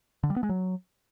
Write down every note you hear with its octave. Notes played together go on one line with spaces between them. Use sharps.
D3
G3
B3
G#3
F#3